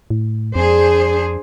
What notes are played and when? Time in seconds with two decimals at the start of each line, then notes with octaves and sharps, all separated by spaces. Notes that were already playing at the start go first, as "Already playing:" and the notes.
0.10 A2
0.56 F2 D4 G#4 C5